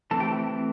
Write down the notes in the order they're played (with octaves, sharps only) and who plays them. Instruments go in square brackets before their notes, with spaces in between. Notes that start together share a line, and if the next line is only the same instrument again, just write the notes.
[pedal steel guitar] E3 A3 C4 A4 A5
G4 G5